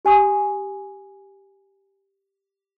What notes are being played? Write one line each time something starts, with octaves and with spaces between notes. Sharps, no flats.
G4 G#5 C#6 D#6